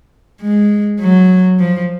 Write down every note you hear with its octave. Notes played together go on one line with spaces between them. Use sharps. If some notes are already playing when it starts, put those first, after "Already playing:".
G#3
F#3
F3